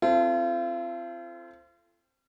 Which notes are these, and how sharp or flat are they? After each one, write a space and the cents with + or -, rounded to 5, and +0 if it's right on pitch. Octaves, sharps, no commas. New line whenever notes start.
C4 +0 F4 -40 A4 +0